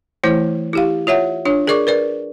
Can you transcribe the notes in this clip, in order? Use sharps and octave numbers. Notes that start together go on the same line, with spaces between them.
E3 A3 E4 C5
E4 G4 F5
F4 C#5 E5 F#5
D4 F4 C#5
G#4 A#4 D5 C#6 D6
A#4 B4 D5